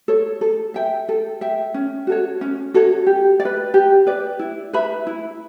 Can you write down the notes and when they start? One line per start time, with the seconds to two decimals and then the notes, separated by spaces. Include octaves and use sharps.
0.08 A4 C#5
0.41 A4
0.74 E5 G5
1.09 A4
1.41 E5 G5
1.74 C#4
2.07 F#4 A4 C#5
2.41 C#4
2.74 F#4 A4 C#5
3.07 G4
3.40 D5
3.45 B4
3.74 G4
4.07 B4 D5
4.39 E4
4.73 B4 E5 B5
5.07 E4